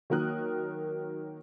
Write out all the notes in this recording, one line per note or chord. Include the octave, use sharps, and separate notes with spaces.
D#3 F#3 A#3 A#4 D#6 F#6